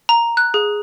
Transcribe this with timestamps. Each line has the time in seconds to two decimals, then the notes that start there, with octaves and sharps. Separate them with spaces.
0.09 A#5
0.37 F#6
0.54 G#4